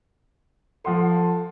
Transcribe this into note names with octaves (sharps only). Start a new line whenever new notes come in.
F3 A4 F#5 C6